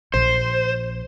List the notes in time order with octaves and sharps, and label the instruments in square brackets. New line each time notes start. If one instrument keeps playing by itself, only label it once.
[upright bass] A#1 [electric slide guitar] C5